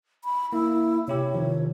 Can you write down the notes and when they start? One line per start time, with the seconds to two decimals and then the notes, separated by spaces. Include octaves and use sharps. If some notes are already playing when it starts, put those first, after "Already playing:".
0.24 B5
0.53 A#3 E4
1.08 C3 E4 G4 C#5
1.35 C3 D#3 F3